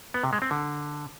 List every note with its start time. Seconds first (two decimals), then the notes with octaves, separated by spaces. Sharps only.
0.14 B3
0.23 C3
0.33 G#3
0.42 C4
0.51 D3